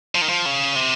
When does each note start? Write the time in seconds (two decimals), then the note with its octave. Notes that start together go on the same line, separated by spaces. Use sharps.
0.15 F3
0.22 D#3
0.29 F3
0.46 C#3
0.76 C3